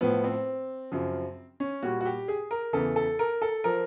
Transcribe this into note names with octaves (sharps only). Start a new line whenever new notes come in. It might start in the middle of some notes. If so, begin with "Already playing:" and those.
A2 F3 B3
C4
F#2 C#3 F3
C#4
A#2 G3 F#4
F#4
G4
G#4
A#4
E2 C#3 E3 A4
A4
A#4
A4
F3 A#4